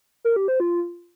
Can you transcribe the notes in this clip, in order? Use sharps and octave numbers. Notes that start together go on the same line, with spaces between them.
A#4
G4
C5
F4